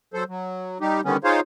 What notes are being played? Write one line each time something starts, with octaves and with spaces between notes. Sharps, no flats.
F#3 A4 C5
F#3
G3 D#4 G4
D3 D#3 G3 B3 C#4
D#4 F4 G#4 C5 C#5 F5